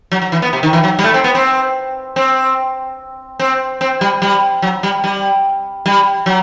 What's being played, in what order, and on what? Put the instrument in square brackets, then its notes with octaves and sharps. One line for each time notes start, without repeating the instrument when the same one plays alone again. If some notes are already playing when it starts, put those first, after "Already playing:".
[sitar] F#3
F#3
E3
B3
C3
D#3
E3
F#3
G3
A3
C4
B3
C4
C4
C4
C4
G3
G3
F#3
G3
G3
G3
F#3